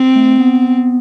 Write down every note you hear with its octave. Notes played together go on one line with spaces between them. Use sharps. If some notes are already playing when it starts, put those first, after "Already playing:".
Already playing: C4
A3
B3